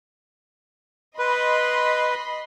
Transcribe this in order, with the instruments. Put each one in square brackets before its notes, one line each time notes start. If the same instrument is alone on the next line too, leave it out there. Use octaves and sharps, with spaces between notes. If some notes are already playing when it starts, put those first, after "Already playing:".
[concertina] B4 [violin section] D#5 B5 C6